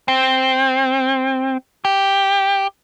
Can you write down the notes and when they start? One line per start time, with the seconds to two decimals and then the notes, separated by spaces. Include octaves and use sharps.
0.08 C4
1.85 G4